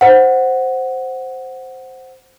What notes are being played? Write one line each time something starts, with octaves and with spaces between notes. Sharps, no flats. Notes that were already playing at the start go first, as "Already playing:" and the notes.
C5 F#5